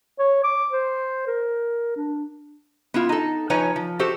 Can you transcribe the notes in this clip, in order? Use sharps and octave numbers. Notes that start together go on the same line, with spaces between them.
C#5
D6
C5
A#4
D4
B3 E4 F4
D#4 A4
F3 D#4 B4 C#5 G#5
F3
F#4 G4 A4 C5